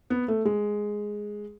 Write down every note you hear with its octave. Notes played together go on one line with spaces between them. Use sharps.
B3
A3
G#3